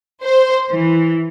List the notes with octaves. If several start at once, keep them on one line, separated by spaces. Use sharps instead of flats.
C5
E3